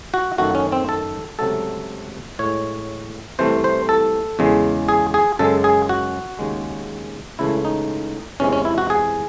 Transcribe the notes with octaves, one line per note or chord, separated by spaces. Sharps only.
F#4
F#2 D#3 A3 F#4
C#4
C4
A4
C#2 C3 F#3 A3 A4
A2 G#3 C#5
C2 C3 E3 A3 C5
C5
A4
E2 C#3 G#3
G#4
G#4
F#2 C#3 G#3 A4
G#4
F#4
D#2 C#3 G#3
C#2 C#3 E3 A3 E4
D#4
E2 C3 E3 G#3 C#4
C#4
E4
F#4
G#4